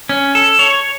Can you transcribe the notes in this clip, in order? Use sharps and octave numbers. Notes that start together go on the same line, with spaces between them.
C#4
A4
C#5